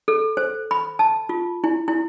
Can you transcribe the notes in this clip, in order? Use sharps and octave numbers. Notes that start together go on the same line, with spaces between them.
A4
C5
B5
A5
F4
E4
E4